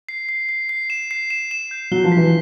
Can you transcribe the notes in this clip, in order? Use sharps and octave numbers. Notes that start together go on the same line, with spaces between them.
C7
C7
C7
C7
E7
C7
E7
E7
G6
F#3 G7
F3
E3 B6